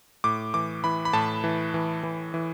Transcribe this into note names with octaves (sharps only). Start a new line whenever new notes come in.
A2 D6
E3 D6
E3 B5
B5
A2 A5
E3
E3
E3
E3